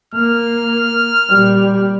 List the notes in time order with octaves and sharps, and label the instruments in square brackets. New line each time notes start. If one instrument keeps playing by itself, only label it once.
[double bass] A#3 [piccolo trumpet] F6
[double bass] A#2 G3